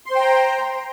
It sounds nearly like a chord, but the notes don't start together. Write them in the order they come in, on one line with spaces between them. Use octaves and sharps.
C6 C5 G5 A#5